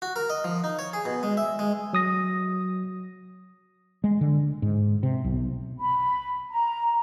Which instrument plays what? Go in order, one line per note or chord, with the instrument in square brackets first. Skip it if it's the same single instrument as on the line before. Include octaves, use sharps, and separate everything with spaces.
[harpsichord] F#4
A#4
D#5
F3
D#4
C#5
G#4
B2
G#3
E5
G#3
[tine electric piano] F#3 D#6 A#6
[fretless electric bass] G#3
D3
G#2
C3
B1
[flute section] B5
A#5